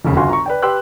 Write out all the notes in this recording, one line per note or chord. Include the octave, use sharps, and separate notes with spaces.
F1 D#2 C#3
G1 F4 F#4 G#5 C6
A#5 C#6
B4 D5 G5
G4 B4 G5 C6 E6 F#6